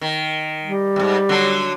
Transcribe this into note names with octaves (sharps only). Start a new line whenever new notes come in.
D#3
G3
D#2 G#2
D3 F#3